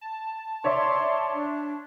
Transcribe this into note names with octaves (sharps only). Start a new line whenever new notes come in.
A5
C#5 D5 E5 C6
D4